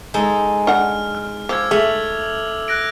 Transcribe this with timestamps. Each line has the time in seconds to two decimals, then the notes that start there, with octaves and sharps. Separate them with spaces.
0.14 G#3 D#4 A4
0.67 D4 F#5 F6
1.15 F6
1.49 F3 D6 E6 G#6
1.71 A3 G#4 F6 F7 F#7
2.68 F#6 A#6 D7